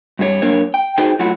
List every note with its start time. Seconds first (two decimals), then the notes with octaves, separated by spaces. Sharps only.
0.19 G2 G3 F#4 C#5
0.42 F#2 A#3 D4 A#4 C#5
0.74 G5
0.98 D#4 F#4 G#4 B4 C5 G5
1.19 F#3 A3 E4 F4 F#5